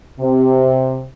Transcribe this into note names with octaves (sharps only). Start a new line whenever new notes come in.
C3